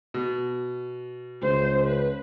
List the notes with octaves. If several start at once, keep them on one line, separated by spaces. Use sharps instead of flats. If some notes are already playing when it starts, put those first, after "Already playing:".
B2
C#2 C5
B4